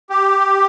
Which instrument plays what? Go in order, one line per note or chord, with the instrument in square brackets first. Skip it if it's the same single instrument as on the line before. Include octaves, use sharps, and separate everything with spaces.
[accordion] G4